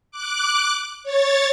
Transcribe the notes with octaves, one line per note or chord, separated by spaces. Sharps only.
D6 F#6
C#5 A6